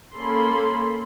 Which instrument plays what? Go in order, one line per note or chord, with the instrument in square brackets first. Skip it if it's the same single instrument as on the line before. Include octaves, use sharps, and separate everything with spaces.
[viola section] A#3 C#4 A4 B5 C6